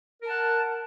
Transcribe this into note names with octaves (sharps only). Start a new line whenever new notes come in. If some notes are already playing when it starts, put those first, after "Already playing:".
A#4 F#5 A5